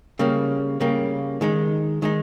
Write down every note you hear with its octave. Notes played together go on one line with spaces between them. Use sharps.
C#3 G3 A#3
C#3 G3 A#3
D#3 G#3 D#4
D#3 G#3 D#4